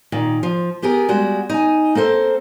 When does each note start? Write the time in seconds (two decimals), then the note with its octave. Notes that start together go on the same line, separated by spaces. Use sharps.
0.12 A#2 D#3
0.43 F3
0.82 B3 G4 G#4 A#4
1.09 G3 G#3 F#4
1.50 D#4 G#5
1.95 A#3 C4 A4 C5